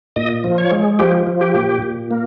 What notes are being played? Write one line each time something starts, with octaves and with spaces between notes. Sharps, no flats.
A#2 D#5
F3
C#5
G#3
F3 G4
F3
G4
A#2
A#2
A#3